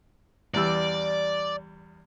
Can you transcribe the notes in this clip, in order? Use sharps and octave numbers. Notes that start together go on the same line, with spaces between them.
E2 G3 D5 E6